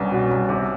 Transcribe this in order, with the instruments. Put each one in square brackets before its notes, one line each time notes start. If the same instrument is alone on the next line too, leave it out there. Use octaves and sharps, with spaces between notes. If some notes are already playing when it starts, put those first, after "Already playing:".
Already playing: [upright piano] C2 [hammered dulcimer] B3 C#4
[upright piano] B2
C2
C3